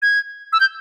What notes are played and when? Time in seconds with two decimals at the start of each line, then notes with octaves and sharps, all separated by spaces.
0.02 G#6
0.53 E6
0.60 G6